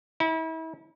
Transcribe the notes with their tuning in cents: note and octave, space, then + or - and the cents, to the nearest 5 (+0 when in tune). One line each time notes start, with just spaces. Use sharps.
E4 -35